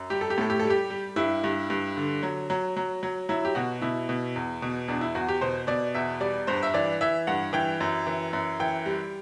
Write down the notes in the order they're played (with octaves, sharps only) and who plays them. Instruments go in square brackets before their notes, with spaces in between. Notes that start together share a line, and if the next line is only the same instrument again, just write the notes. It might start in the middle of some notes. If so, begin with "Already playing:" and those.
Already playing: [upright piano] F#2
G3 G4
A4
G4
A2 A4
G4
G3 A4
G4
G3
G2 E4
G2
G2
D3
F#3
F#3
F#3
F#3
F#3 E4
G4
B2 F#4
B2 E4
B2
E2
B2
E2 D4
E4
E2 F#4
G4
B2 C5
B2 D5
E2 E5
G3 D5
G2 C5
E5
E3 D5
E3 E5
G2 F#5
E3 G5
F#2
E3
F#2
E3 G5
G3